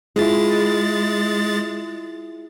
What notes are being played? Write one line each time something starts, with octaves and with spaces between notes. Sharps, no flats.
G#3 E4 F4 G#4 A6